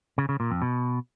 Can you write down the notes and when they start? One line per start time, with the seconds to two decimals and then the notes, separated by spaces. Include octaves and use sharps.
0.18 C#3
0.29 C#3
0.40 A#2
0.51 F2
0.62 B2